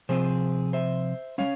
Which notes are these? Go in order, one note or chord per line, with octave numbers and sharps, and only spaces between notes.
C3 F3 C4 G#4 C5
C5 E5
G3 C#4 C#5 F5